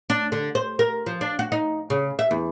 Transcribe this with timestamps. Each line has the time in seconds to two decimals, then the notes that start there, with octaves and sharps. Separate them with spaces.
0.10 D4
0.32 D3
0.55 C5
0.79 A#4
1.06 F3
1.21 D4
1.39 F#4
1.52 D#4
1.90 C#3
2.19 E5
2.31 E2